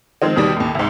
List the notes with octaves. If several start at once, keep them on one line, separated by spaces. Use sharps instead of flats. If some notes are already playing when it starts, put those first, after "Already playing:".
D#3 F3 G#3 C4
D#2 B2 D#3 G3
D#2 A2
C2 G#2